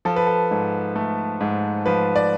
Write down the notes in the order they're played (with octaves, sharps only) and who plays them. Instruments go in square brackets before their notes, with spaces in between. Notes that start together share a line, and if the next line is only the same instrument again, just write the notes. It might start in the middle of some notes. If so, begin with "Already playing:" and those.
[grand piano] F3 A4
B4
A4
G#2
A3
G#2
F3 B4
D5